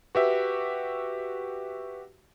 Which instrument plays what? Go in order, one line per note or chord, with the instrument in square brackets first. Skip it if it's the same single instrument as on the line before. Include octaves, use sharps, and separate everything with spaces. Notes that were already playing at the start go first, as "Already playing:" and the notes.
[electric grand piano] F#4 G4 E5 [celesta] B4